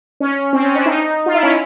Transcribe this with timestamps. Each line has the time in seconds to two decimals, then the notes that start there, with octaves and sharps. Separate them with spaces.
0.20 C#4
0.53 C4
0.64 C#4
0.75 D4
0.86 D#4
1.26 F4
1.34 E4
1.43 C#4